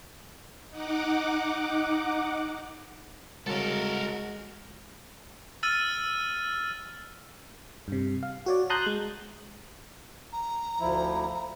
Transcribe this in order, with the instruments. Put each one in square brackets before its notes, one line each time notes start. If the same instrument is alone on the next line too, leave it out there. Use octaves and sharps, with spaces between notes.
[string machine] D#4 F#5 D6
[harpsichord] C2 C#3 [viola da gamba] G#3 [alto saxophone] F#4 [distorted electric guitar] A4 A#4
[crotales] E6 F6 A6 D#7
[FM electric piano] G2 C3
F5
F#4 C#5 D5
A5 A#5 C6 D#6 F#6 G6
G#3
[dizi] A#5
[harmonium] D2 F3 E4